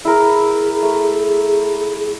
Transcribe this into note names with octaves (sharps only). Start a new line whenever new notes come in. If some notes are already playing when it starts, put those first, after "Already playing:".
E4 G#4 A#4
A3